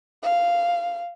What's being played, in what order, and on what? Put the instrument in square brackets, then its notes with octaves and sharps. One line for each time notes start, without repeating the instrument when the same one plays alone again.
[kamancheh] F5